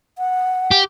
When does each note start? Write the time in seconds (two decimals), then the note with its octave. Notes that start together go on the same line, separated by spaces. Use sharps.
0.18 F#5
0.71 G4